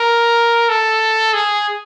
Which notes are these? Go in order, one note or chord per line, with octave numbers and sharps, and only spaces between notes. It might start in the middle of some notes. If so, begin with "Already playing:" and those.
Already playing: A#4
A4
G#4